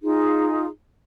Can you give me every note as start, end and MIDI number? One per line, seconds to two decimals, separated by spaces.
0.02 0.66 63
0.02 0.66 65
0.02 0.66 68